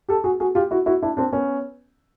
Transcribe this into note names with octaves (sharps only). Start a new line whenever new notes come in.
G4 A4
F#4 G#4
F#4 G#4
F4 G4
E4 F#4
E4 F#4
D4 E4
C4 D4
B3 C#4